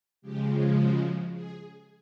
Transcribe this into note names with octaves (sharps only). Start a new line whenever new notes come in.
C#3 F3 G#3 G4
F#4
G#4